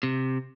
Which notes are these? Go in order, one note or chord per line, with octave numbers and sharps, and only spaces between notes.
C3